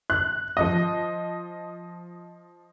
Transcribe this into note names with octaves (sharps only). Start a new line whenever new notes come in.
F#6
F3 D#5